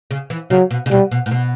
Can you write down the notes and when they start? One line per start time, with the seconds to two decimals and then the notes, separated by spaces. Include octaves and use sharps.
0.11 C#3
0.30 E3
0.50 C#3 F#3
0.71 B2
0.86 C#3
0.91 B2 G3
1.12 B2
1.26 A2
1.31 B2